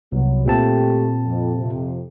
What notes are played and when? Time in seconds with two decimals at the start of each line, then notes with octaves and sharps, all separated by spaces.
0.12 C2 F#3 B3
0.46 A#2 A3 C4 G4 A5
1.25 F2
1.56 F2 C3